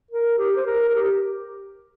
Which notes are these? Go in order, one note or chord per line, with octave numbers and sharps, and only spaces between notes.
A#4
G4
C5
A#4
A#4
G4